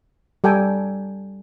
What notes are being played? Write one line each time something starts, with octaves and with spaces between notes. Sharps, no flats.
G3 A4 G5 G#5 A#5